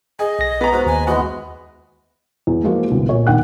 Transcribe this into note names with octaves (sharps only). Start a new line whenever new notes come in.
G#4 D#5
B1 A#6
B3 A#5
G#2 F#4
D#2 G#5
E3 G#3 B3 F#4 D#5
E2
E3 F3 G#3 A#3 F#4
G1 C2 B2
A#2 C#5
E1 D#2 D4 F#5 G5 F#6